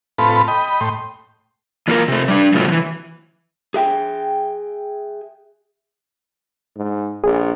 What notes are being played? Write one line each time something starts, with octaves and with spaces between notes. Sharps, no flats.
A2 C4 F4 A4 B4 B5
D#5 G5 B5
A2 G5 C6
E3 A#3 F4 A4 A#4
C3 A3
G3 D4
A2 C3 F3 F#3 A3 A#3
E3 F3
G#4 E5 G5
G#2
A#1 G#4